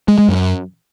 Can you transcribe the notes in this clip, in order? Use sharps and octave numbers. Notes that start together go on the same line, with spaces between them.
G#3
G#3
F#2